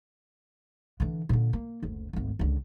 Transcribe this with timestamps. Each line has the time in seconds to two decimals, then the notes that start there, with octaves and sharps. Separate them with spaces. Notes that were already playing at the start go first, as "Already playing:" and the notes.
1.00 D3 E3
1.29 A#2 D3
1.53 A#3
1.82 F#1 D2
2.13 G#1 D2
2.39 C#2 D3